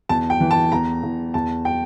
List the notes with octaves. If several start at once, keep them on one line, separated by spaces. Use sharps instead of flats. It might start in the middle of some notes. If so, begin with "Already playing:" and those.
E2 A5
G5
E3
A5
E2 A#5
E2
E2 A5
G5